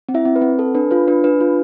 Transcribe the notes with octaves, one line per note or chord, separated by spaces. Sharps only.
C4
E4 E5
C4
B4
C4
A4
D4 B4
F4 B4
D4 B4
D4 B4
F4